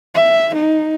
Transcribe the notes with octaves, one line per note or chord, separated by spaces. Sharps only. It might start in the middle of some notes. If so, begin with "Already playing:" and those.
E5
D#4